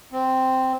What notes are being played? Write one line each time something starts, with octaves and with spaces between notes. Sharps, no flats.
C4